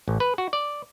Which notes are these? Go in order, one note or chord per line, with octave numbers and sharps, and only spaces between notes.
A1
B4
F#4
D5